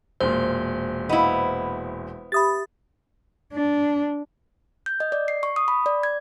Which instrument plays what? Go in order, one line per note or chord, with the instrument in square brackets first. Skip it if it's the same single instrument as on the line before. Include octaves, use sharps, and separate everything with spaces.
[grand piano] E1 A#2 [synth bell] C5
[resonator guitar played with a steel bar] B3 E4 [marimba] D#5 F5
[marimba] G4 E5 [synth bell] B5 D#6 A6
[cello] D4
[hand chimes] G6
D#5
D5
C7
C#6
D#6
B5
D5
G#6